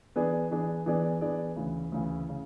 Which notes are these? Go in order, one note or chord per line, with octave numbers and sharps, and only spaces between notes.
E3 B3 D4 G#4 D5
E3 B3 D4 G#4 D5
E3 B3 D4 G#4 D5
E3 B3 D4 G#4 D5
D2 C#3 E3
D2 C#3 E3
C#3